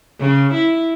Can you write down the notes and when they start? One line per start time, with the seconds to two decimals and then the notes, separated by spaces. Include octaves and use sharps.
0.20 C#3
0.54 E4